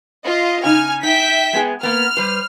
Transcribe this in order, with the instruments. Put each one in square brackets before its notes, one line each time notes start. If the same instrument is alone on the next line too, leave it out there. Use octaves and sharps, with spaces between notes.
[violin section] F4 D#5
[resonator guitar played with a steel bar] C#3 D#4 [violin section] G#5 F6
[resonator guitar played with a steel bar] D#4 [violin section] E5 G5 B6
[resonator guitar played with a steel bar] G#3 B3 G#4
[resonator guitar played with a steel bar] A#3 B3 [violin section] F6
[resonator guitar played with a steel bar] G3 B4 C5